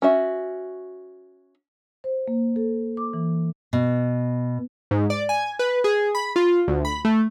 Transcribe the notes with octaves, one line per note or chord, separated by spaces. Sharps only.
C#4 F#4 E5
C5
A#3
A4
D6
E3
B2
G#2
D5
G#5
B4
G#4
B5
F4
D2
B5
A3